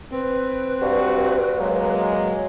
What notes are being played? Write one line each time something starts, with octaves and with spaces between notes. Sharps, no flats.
C4 B4
G2 F#4
F#3 G#3 A#3